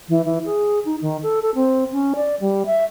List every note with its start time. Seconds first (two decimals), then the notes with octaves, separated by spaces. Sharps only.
0.09 E3
0.25 E3
0.45 G#4
0.85 D#4
1.01 D#3
1.23 A4
1.42 A4
1.55 C4
1.92 C#4
2.16 D5
2.40 G3
2.66 E5